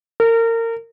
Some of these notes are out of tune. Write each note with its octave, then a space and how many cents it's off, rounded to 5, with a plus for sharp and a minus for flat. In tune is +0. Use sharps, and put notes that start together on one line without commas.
A#4 -30